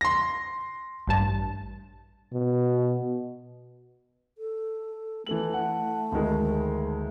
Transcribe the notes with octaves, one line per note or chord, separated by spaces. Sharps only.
C6 A#6
A1 G2 A5
B2
A4
E3 A3 A4 F#7
F#5
D2 D#3 G#3